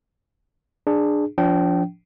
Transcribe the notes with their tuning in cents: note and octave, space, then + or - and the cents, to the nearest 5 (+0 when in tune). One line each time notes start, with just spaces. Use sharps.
D4 +15 G#4 +0
F3 +0 D4 -35 G5 -25